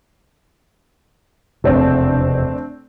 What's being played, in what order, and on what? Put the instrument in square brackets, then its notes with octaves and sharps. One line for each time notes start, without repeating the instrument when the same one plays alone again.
[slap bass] F1 E2 B2 [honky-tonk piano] A3 C4 D4